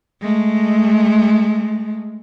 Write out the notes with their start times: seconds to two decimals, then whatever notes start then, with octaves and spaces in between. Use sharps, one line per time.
0.22 G#3 A3